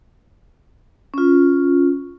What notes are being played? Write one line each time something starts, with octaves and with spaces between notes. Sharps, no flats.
C#4 F4